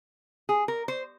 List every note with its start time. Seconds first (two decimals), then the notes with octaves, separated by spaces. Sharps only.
0.49 G#4
0.68 A#4
0.88 C5